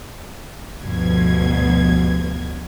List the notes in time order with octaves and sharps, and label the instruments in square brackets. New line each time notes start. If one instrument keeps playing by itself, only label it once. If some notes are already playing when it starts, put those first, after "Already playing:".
[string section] D2 G2 B2 F3 G#6